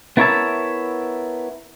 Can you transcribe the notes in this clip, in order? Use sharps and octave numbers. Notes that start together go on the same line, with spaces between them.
B3 E4 A#4 C#5 E5 A5